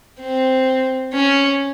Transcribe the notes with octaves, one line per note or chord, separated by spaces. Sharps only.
C4
C#4